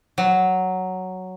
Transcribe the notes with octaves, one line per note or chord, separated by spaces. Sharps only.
F#3